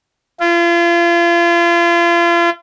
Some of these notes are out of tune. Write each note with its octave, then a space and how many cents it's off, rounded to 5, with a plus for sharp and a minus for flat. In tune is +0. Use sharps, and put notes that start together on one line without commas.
F4 -35